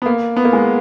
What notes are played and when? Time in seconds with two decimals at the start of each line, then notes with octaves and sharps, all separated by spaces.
0.02 B3
0.06 A#3
0.36 B3
0.45 A#3
0.53 G#3